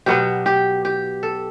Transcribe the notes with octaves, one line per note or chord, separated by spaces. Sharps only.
B2 F#3 B3 G4
G4
G4
A4